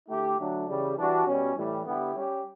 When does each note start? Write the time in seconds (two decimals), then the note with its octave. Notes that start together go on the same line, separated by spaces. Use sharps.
0.08 D3 A3 E4 G4
0.38 D3 F#3 A3 D4
0.67 C#3 E3 G3
0.97 E3 G3 D4 F#4
1.26 B2 G3 C#4
1.55 A2 E3 G3
1.85 D3 G3 B3 E4 G4
2.14 G3 C#4 G4